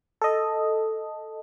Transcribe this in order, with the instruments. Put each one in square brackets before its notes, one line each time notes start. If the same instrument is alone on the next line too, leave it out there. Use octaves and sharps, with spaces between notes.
[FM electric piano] A4 D#5